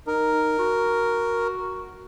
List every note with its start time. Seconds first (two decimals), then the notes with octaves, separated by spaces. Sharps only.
0.07 D#4 A#4
0.59 F#4